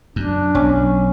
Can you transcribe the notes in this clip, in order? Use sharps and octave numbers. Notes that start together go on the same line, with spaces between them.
F#2 D4
B1 C#4